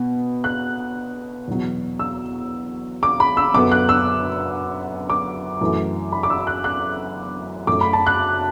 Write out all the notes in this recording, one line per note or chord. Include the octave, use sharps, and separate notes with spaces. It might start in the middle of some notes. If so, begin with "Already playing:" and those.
Already playing: B2 B3
F#6
E2 B2 F#3
E6
D6
B5
E6
F#2 D3 B3 D6
F#6
E6
D6
F#2 E3 A3
B5
D6
E6
E6
F#6
F#6
F#2 F#3 A3 D6
B5
A5
F#6